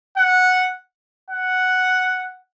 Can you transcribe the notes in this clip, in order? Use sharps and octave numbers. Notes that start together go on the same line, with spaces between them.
F#5
F#5